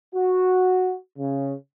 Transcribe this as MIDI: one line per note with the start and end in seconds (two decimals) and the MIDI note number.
0.15 0.94 66
1.18 1.52 49